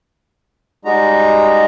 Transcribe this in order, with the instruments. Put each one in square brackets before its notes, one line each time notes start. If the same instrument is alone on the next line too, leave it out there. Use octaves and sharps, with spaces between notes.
[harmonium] G3 G#3 D#4 F#4 A#5